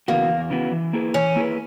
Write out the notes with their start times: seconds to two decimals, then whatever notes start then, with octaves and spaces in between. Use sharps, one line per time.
0.08 C#3 E3 A#3 B3 F#4
0.29 E2
0.50 C#3 E3 B3 F#4
0.72 E3
0.93 A#3 E4 G#4 B4
1.14 E3 C#4
1.36 A#3 E4 G#4 B4